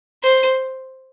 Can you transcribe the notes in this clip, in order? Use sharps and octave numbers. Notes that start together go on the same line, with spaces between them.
C5